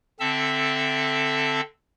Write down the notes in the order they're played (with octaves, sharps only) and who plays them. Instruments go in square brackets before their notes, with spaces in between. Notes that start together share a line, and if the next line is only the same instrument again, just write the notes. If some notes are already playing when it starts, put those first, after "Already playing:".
[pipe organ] D3 C4 A4 E5 A5 E6